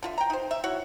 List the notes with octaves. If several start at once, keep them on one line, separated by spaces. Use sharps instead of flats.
D3 F4 E5
G5 A#5
D#4 C5
E5
E4 F#4 C#5 F#5